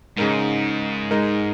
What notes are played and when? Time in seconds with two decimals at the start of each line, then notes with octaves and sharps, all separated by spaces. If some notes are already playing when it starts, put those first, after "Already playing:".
0.18 G#2 C#3 G#3 D#4 A#4
1.11 G#3 D#4 A#4